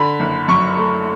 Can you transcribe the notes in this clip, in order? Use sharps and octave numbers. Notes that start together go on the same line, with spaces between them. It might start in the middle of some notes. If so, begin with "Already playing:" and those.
Already playing: D3 B5
F#1
F#2 C#6
A3